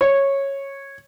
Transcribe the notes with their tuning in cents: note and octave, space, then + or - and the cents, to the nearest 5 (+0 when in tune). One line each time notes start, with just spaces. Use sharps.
C#5 -10